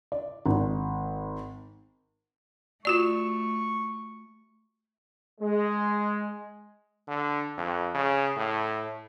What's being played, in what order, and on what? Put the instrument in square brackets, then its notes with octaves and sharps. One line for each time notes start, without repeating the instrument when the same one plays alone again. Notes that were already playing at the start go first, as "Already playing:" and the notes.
[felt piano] D5
G#1
[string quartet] A3 [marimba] F4 F#4 D5 [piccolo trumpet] C#6
[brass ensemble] G#3
[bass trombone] D3
F2
C#3
A2